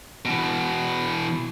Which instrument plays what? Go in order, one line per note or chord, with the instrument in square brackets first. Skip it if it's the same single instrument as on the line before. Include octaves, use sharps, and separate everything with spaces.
[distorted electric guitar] B2 E3